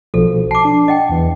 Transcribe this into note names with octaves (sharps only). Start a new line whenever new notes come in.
B1 B2 F3 A4
A5 D6 C7
D4
D#5 F#5 G5
E2 E3